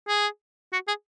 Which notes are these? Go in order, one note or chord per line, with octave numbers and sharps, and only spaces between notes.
G#4
F#4
G#4